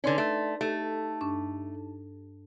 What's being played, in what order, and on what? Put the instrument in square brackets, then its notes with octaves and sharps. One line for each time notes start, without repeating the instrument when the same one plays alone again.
[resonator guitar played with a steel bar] D3 C#4 [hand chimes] D#4 D5 C6 [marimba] B4
[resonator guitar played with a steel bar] A3
[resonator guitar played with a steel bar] A3 [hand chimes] D#4 A5 [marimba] G4 A4
[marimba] G2 D4 C#6